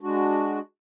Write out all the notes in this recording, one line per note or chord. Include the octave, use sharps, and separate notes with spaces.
G#3 D4 F#4